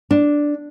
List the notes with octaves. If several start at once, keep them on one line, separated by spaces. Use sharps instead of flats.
D4